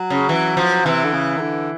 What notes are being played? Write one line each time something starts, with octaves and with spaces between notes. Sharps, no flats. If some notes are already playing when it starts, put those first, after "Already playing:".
Already playing: F#3
C#3
E3
F3
C3 E3
D3
C#3
D#3
D3